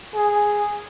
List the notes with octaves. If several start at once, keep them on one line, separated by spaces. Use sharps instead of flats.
G#4